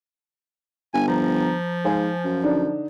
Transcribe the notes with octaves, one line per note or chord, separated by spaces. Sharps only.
G1 G#5
F3 A#5
G#2 C5 F5 G#5
F#2
D3 D4 D#4